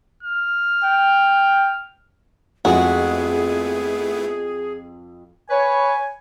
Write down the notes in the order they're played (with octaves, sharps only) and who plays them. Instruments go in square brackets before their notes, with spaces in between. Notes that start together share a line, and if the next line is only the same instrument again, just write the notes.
[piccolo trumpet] F6
[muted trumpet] G5
[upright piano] F2 [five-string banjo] G#3 F#4 [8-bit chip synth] A3 B3 E4 [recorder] G#4
[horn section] B4 C#5 [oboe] G#5